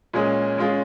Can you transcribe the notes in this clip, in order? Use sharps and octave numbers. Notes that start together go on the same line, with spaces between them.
A#2 G#3 C#4 G#4
G#3 C#4 F4 G#4